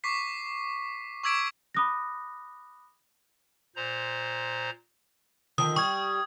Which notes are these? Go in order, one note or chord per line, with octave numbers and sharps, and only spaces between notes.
C#6 D6 B6 C7
C#6 D6 E6 G#6 B6 D7
B5 D6 D#6 F#6 A#6
A#2 C5 A#5
D3 D#3 F3 D#6
G3 C#6 D#6 G#6